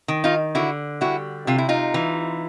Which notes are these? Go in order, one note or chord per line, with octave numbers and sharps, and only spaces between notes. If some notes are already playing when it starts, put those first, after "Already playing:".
D#3
D#4 F4
D3 E4 F#4
G3 E4 F#4
C3 F4
E4
D#4 F4
E3